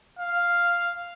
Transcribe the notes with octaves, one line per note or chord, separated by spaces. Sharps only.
F5